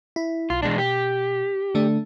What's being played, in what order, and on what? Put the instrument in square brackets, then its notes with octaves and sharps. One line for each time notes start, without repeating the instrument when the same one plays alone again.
[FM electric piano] E4
[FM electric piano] B1 [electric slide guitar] F4
[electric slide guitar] E2 G#3 D4 [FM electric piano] B2
[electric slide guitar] G4
[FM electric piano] D3 A3 D4